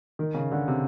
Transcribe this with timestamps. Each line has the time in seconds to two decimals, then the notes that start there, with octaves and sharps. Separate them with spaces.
0.19 D#3
0.34 C#3
0.52 D3
0.68 C3